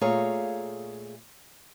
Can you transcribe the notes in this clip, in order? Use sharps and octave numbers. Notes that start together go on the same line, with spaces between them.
A#2 A3 G#4 C#5 F5 A#5